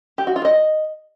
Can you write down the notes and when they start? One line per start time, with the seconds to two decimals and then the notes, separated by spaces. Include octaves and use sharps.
0.18 G4
0.27 F#4
0.36 F4
0.45 D#5